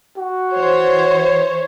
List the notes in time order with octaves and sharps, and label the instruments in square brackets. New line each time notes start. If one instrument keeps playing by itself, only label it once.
[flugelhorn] F#4
[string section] E3 C5 C#5